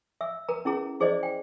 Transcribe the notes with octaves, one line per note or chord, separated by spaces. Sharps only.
E5 E6
A#4 B4 A#5
C#4 E4 G#4 A#5
E4 G#4 C5 D5 D#5
G5